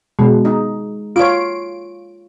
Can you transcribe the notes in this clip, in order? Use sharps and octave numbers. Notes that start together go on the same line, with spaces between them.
B2 G#3
D#4
F4 C#5 D7